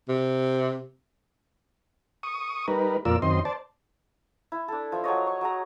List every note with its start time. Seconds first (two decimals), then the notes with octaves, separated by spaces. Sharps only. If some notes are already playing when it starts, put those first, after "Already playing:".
0.09 C3
2.23 C#6 D#6
2.68 G3 D#4 A#4 B4
3.05 F2 A#2 F4 A#4 D5 E6
3.22 F#2 D#3 C4 D#5 C6
3.45 C5 D5 A5
4.52 E4
4.68 D4 A4
4.92 F3 E5
5.04 F#3 G#4 C#5 D#5
5.27 C#6
5.41 F#3 G#4 A#5